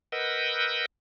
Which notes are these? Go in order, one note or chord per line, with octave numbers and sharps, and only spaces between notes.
A#4 B4 D#5 F#5 E6 G6